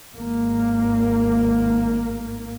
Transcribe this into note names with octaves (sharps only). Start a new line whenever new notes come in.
G#1 A#3